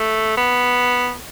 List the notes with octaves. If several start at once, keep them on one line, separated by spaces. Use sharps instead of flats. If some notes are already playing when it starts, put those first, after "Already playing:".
Already playing: A3
B3